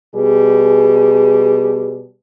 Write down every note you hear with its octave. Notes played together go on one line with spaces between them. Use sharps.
B2 G3 G#4